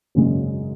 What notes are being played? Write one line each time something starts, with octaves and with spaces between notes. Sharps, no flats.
G#1 F#2 C#3 G#3